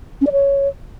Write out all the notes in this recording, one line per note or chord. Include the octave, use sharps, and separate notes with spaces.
C#4
D5
C#5